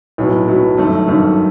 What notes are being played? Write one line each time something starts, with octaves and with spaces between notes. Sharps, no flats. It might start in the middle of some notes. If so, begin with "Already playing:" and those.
B1 A2 F#3 B3
B1 A2 F#3 B3
G1 F#2 D#3 A3
G1 F#2 D#3 A3